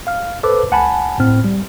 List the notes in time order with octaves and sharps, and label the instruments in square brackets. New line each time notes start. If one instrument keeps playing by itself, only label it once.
[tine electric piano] F5 F6
A4 B4 C5 D6
C#2 F#5 G#5 A5 B5
A2 C4 F6
G3